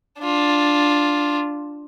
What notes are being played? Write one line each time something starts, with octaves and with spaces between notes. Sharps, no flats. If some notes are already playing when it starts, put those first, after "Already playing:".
D4 F4